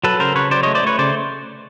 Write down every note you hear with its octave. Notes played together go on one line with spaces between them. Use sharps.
F#3 A4 B4
C#3 A#4 C5
C#3 B4 C#5
F#3 C5 D5
A3 C#5 D#5
C5 D5
A3 B4 C#5
C#3 C5 D5